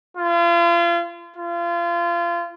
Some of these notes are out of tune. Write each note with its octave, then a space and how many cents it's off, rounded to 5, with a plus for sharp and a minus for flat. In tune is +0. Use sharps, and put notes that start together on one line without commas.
F4 -35
F4 -30